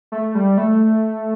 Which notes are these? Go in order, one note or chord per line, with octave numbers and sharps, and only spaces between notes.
A3
G3
A3